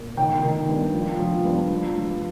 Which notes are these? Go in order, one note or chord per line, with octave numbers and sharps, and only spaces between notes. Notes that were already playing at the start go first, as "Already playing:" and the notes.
Already playing: A#2
D#3 G5
D#3
G2
F3
F3
G2
F3
F3